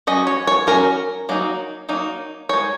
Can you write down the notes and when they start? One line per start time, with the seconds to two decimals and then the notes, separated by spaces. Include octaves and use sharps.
0.07 F#3 C#4 D#5
0.27 C#5
0.47 C#5
0.67 F#3 C#4 A#4
1.29 F#3 A#3 D#4
1.89 F#3 A#3 D#4
2.49 G#3 D#4 C#5